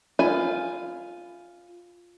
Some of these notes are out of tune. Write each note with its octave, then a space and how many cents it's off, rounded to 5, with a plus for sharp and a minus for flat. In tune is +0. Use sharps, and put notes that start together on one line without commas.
F4 +0 G#5 +0 B5 +20